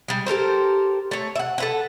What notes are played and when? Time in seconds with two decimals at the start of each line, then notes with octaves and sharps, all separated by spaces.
0.08 G3 G#3
0.26 G4 A4 A#4 C5
1.11 A3 C#5
1.36 E5 F#5
1.58 A4 B4 F#5